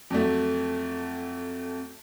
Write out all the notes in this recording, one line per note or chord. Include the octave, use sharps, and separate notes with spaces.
F2 F#3 A3